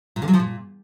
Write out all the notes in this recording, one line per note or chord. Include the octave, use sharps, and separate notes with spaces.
A#2
D3
F#3
F3
A#2